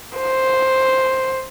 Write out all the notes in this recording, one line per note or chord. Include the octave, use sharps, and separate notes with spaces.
C5